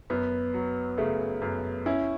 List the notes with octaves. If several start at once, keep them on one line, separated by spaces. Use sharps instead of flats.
F#2 B3
F#3
C#3 A3
F#2 B3
C#4 E4